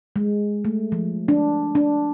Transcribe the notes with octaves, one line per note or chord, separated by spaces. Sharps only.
G#3
A3
F3
D4
D4